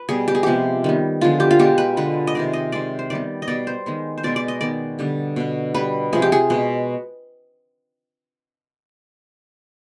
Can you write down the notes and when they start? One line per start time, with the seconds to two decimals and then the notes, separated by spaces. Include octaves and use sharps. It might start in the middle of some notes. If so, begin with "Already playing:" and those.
Already playing: B4
0.09 B2 G3 B3 G#4
0.28 G4
0.35 G#4
0.43 C3 F3 G#3 B3 G4
0.84 D#3 G3 B3
1.21 D3 F3 G#3 B3 F4
1.40 G4
1.51 F4
1.59 B2 G#3 B3 G4
1.78 B4
1.97 D3 G#3 B3 B4
2.27 D#5
2.35 C3 D#3 G#3 D5
2.53 D#5
2.72 C3 D#3 G#3 D5
2.99 C5
3.10 D#3 G3 B3 D5
3.42 D#5
3.48 B2 G3 B3 D5
3.67 C5
3.86 D#3 G#3 B3
4.18 C5
4.23 B2 G#3 B3 D5
4.36 D5
4.48 D#5
4.61 D#3 B3 D5
4.99 D3 G3 B3
5.36 B2 B3
5.75 B2 G3 B3 B4
6.13 C3 F3 G#3 G#4
6.22 G4
6.32 G#4
6.50 B2 G#3 B3